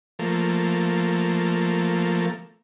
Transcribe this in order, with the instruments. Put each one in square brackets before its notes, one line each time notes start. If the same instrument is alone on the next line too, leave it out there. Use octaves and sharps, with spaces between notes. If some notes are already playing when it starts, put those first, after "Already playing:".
[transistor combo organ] F3 A3 A#3